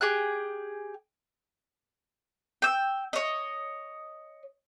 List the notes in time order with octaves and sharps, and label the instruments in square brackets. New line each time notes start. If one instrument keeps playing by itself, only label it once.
[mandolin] G4 G#4 G5 F#6
G5 E6
C#5 D#5